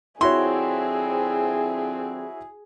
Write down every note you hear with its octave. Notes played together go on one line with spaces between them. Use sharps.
D3 F3 C4 E4 F#4 G#4 C#5 C6